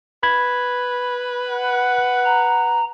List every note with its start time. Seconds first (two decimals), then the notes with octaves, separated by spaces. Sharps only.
0.23 B4 B5 G#6
1.49 F#5
2.25 A#5